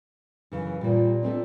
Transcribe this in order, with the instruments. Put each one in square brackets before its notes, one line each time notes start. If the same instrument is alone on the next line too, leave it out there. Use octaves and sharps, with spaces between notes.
[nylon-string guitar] F#2 C#3 E3
[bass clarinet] A#2 [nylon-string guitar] G3 A#3
[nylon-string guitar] A3 C4 D4